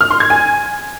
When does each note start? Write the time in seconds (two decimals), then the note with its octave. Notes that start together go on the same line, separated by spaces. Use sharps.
0.01 F6
0.10 C6
0.20 G#6
0.30 G#5